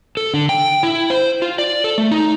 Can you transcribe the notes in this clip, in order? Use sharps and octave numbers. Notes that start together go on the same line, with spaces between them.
A4
D3
G5
E4
C5
F4
D5
A4
A3
D#4